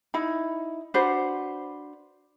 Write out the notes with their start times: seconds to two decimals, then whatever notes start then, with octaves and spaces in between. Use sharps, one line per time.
0.14 D#4 E4 B5
0.94 D4 F#4 B4 C5